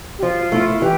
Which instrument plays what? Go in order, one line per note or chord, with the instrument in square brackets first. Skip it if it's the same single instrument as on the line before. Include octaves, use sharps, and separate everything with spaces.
[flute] G4
[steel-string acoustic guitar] F3 [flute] F4
[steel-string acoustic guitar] A3 E4
[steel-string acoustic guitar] E3 [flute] G4